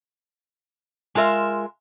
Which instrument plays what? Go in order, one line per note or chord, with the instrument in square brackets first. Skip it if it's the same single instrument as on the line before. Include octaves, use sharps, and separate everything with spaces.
[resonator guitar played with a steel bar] G#3 F4 A#4 E5